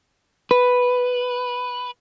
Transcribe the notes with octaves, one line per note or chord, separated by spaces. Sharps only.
B4